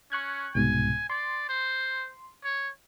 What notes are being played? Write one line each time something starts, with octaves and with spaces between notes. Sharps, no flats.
C#4 C#6 F#6 G#6
C2 G#2 B2 G#5
D5 C6
C5
C#5